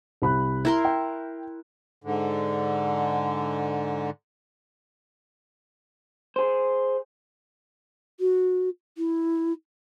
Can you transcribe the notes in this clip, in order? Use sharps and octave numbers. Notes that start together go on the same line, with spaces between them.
C2 B5 F#6
E4 A#4 C6
G5
G#2 D3
G#4 C5
F#4
E4